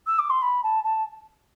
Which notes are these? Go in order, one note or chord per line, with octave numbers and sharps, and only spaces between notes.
E6
D6
C6
B5
A5
A5